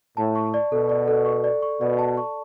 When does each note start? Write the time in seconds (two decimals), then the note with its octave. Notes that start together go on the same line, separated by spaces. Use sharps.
0.17 A2 A5
0.35 C#6
0.54 D5
0.72 B2 A4
0.89 D5
1.08 A4
1.26 C#6
1.44 D5
1.62 C#6
1.80 B2 D5
1.99 A5
2.17 C#6